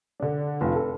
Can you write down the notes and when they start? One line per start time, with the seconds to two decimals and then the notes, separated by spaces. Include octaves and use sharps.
0.20 D3 D4
0.61 F1 F4
0.76 A4